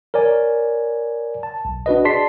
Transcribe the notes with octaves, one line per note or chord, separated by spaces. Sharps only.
A#4 C#5 D5 G#5
A5
B1
D4 F#4 B4 D#5
G#4 D5 A5 C6 B6 C7